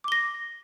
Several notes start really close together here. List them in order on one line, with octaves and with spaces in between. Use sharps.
D6 G7 A#6